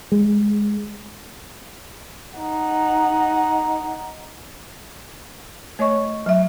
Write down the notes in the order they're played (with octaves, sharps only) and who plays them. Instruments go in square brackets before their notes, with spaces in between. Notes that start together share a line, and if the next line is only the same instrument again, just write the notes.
[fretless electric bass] G#3
[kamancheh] D#4 F#5
[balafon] A3 C#5 D#5 C#6
F#3 E5